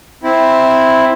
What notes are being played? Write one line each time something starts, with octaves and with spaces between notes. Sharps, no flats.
C4 E4